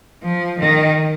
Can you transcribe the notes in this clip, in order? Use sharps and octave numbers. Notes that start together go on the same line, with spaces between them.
F3
D#3